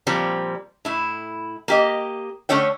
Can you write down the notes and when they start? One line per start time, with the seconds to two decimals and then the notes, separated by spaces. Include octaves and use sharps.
0.07 A#2 F3 G3 C4
0.85 A2 E4
1.68 A#3 G4 D#5
2.49 D3 A3 C#4 E4 C#5 G5